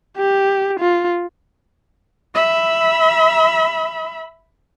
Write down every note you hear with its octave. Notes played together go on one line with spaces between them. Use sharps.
G4
F4
E5 B5